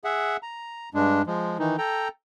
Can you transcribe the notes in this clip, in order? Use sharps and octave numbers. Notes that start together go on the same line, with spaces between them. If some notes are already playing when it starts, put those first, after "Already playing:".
G#4 E5 F#5
A#5
G2 G#3 D4
F3 G#3
D#3 E3 D#4
A4 G5 A#5